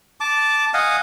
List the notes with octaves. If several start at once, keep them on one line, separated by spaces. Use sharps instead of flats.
A5 D6
D#5 F5 F#5 G#5